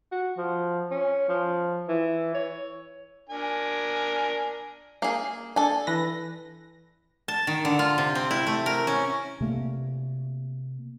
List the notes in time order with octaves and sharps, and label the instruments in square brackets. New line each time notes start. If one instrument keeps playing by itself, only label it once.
[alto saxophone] F#4
F3
C#4
F3
E3
C#5
[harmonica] D4 A#4 G#5
[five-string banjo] A#3 G#4
[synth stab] D4 [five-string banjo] A4 G#5
[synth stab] E3 B4 A#6
[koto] A5
D#3
D3
F4
C3
C4
E4
A3
A#4
C#4
[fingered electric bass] C3 A3 A#3